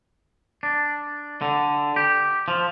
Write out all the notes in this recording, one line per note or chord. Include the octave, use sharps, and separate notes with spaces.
D4
D3
G4
F3